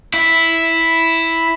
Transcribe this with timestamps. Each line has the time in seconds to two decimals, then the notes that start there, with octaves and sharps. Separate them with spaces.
0.14 E4